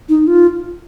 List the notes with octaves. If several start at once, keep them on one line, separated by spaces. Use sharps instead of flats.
D#4
F4